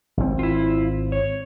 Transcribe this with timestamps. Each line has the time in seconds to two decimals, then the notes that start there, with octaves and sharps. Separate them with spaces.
0.17 G#1 C4
0.39 E4 F4
1.12 C#5